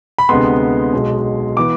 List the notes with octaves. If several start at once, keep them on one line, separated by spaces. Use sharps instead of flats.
B5
D2 C3 G#3 B3 C6
B1 B2 G#3
E3 B3 E4 D6